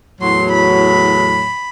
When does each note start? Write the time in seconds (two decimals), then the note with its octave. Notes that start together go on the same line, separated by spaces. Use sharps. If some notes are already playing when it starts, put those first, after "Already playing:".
0.21 E2 A2 F#3 C6
0.54 B5